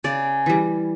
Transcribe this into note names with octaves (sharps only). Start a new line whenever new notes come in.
C#3 D5
E3 G3